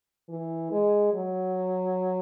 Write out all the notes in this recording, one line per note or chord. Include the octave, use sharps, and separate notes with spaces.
E3
G#3
F#3